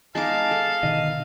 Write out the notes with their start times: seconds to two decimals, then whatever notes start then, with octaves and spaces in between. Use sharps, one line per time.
0.15 G#3 D#4 F5 A5 D6
0.51 A4
0.83 B2 D3 D#3 D#5